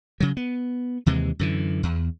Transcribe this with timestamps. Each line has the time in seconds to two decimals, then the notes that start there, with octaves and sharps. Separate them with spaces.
0.20 C#3 F#3
0.37 B3
1.06 D#2 C3 E3 G#3
1.39 F#2 D3 E3
1.83 E2